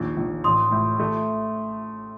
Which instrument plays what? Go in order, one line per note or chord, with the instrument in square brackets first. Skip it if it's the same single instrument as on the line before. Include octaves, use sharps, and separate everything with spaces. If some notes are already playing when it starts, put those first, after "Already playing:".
Already playing: [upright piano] A#1 D#2
A#1
[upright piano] A1 [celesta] C6 D#6
[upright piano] A2
A3